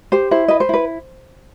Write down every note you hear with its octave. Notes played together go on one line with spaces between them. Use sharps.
G4 C5
E4 C5
B4 D#5
C5
E4 B4